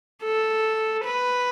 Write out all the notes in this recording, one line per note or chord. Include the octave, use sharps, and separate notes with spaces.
A4
B4